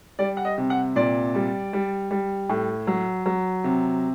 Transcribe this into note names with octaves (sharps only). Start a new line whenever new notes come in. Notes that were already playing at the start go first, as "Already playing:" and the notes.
G3 D5
F#5
D#5
C3
F#5
A#2 D5
G3
G3
G3
A2
F#3
F#3
C3